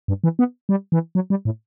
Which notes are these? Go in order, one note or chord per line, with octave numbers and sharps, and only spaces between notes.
G2
E3
B3
G3
E3
F#3
G3
A2